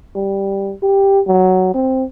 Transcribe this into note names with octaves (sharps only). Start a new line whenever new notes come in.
G3
G4
F#3
C4